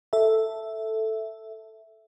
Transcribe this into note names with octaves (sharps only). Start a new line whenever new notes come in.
A4 E5